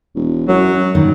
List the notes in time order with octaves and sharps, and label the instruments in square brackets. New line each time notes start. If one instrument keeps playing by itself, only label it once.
[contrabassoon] E1
[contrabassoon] F#2 [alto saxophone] F#3
[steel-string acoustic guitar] G2 A#2 D#3